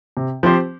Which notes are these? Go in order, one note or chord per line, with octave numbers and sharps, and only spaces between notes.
C3
F3 C4 G4 C5